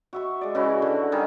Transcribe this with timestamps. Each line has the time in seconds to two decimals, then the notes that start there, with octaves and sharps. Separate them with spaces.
0.13 F#4 E5 C#6
0.41 G#3 D5
0.55 C#3 E3 E4 F#4
0.82 D3
1.12 D#3 G3 G4 G#4